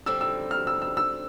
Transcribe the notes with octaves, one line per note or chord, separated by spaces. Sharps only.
D3 G3 C4 E6
E6
F6
E6
E6
E6